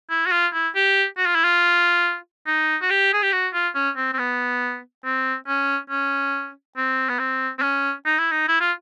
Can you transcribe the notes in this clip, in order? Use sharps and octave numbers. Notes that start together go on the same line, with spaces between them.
E4
F#4
F4
E4
G4
F#4
F4
E4
F4
D#4
F#4
G4
G#4
G4
F#4
F4
C#4
C4
C4
B3
C4
C#4
C#4
C4
B3
C4
C4
C#4
D#4
E4
D#4
E4
F4